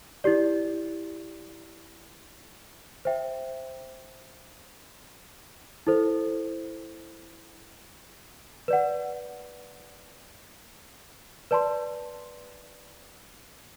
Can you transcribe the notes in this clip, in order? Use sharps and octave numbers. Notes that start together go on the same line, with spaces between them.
E4 G4 D5
C5 E5 G5
E4 A4 C5
B4 D5 F#5
B4 D5 A5 C6